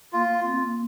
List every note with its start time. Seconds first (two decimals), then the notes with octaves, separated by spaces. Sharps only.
0.13 A#3 F4
0.28 A#3
0.44 C4
0.59 A#3